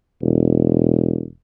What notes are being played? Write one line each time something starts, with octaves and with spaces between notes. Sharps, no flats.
E1